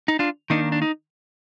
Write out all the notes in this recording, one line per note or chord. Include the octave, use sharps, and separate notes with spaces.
D#4
D4 F4
D#3 A#3 D4 D#4
D4
D#4